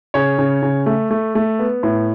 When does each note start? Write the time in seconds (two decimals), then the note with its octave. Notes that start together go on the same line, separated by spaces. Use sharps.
0.14 C#3 C#5
0.38 C#3
0.62 C#3
0.86 A3
1.11 A3
1.35 A3
1.59 B3
1.83 A2